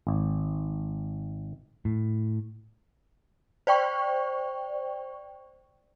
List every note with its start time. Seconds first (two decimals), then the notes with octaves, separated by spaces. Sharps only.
0.07 G#1
1.85 A2
3.67 C5 D5 G5 C#6